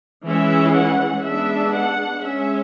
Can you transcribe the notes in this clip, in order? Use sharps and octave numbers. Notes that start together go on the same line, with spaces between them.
E3 G#3 C#4 E5
F#5
G#3 B3 D4 E5
F#5
G#3 C#4 E5